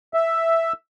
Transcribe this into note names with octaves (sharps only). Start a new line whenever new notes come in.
E5